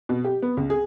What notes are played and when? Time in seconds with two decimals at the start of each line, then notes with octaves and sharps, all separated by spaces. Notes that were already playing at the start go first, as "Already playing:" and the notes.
0.09 B2
0.25 G4
0.42 B3
0.57 C#2
0.70 G#4